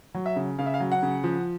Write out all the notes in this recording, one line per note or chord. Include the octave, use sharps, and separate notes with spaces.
F#3
E5
C#3
C#3 F5
E5
F5
F#3
F#5
C#3
F3